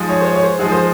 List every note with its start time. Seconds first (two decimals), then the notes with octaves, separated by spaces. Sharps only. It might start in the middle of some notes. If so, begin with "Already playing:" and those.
Already playing: F3 G#3 D#4
0.09 C#5
0.21 C5
0.25 C#5
0.35 C#5
0.43 C5
0.59 F3 G#3 D#4 G#4
0.72 C5